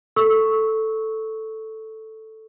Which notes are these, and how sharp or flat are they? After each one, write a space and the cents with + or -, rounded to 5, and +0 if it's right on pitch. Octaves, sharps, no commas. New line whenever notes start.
A4 +0 C#6 +0 E6 -20